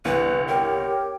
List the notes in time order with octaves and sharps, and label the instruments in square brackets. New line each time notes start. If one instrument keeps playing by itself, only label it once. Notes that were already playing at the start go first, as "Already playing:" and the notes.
[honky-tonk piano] G1 C2 E3 [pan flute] B4
[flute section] G4 C#5 G5 [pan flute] A#4